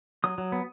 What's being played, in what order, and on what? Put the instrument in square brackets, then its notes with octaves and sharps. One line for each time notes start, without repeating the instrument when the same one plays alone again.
[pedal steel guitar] F#3 D#6
F#3
B3